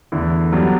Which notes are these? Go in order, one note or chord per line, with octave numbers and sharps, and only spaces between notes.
E2 D3 A3 E4
G2 F#3 B3 D4 G4